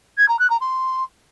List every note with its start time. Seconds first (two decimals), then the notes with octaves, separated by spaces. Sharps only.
0.18 G#6
0.28 A#5
0.39 F#6
0.50 A#5
0.61 C6